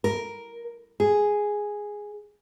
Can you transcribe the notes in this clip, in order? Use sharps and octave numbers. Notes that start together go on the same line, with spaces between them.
A#4
G#4